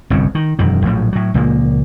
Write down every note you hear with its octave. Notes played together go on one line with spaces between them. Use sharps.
G1 C2 F2 C#3
D#3
E1 F#2 D#3
A#1 A2 F3 F#3
A2 F#3
C#2 A#2 F3 A#3